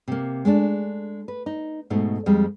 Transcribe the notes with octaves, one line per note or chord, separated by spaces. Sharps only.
C3 A#3
G#3 A3 C#4 D4
B4
D#4
G#2 B2 A3 D#4
F2 G3 G#3